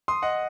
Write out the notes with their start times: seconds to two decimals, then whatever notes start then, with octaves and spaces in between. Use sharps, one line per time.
0.08 C6 D#6
0.22 D#5 F#5